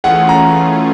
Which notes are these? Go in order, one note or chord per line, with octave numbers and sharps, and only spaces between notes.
E3 A3 C#4 F4 G#4 F#5
A#5